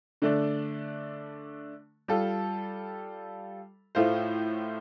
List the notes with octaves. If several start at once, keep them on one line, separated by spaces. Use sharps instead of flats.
D3 A3 D4
G3 F4 A4
A2 A3 F4 C5